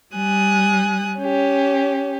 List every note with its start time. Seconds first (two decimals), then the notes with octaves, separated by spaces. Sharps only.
0.15 G3 G#5 D#6 F#6
1.19 C#4 G4